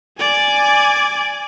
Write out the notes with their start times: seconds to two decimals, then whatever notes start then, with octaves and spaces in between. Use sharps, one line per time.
0.19 D5 G#5